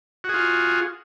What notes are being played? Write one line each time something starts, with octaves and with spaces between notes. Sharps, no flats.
F4 F#4 G#4